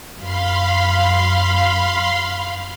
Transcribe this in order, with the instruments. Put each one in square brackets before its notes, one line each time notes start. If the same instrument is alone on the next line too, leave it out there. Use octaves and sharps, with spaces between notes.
[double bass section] F#2 [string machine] F5 B5 C6